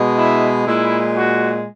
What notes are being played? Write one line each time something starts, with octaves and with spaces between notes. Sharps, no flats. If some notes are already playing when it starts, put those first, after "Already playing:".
Already playing: B2 G#3
E4
A#2 G#3 E4
F#4